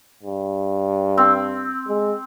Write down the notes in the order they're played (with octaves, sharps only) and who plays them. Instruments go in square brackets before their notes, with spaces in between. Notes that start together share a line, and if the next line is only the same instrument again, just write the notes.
[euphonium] G2
[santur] C4
[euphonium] G#3